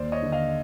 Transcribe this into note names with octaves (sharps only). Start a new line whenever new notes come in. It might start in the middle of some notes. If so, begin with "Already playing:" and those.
Already playing: D#2 C5 D5
C#5 D#5
D3
D#5 F5